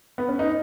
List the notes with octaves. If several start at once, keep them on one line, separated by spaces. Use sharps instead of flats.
B3
C#4
D#4